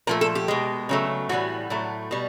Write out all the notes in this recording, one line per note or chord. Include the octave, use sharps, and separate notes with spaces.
A#2 F3 A3 A#4
A4
G4
B2 G#3
C#3 F#3 A3
A2 E3 G3 F#4
A2 F#3 A3
B2 G3